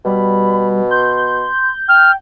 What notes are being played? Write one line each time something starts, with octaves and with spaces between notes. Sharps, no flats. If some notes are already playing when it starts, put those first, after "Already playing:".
B2 G3 B5
C6 G6
G5 F6